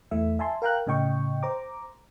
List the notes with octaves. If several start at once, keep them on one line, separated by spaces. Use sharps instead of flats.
E2 E3 A3 E5
E5 G#5 A5 C6
A#4 F5 G5 A#5 F#6
A2 C#3 D#5 G5 C#6
C5 A#5 D6